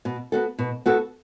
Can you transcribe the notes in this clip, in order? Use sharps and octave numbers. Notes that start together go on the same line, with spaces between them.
B2
B3 F#4 A4
B2
B3 F#4 A4